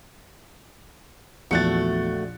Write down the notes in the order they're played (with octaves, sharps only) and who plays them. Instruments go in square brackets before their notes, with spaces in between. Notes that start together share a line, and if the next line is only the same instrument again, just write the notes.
[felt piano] A#1 F#6 A6 [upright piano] E2 C#7 [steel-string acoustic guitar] A3 F#4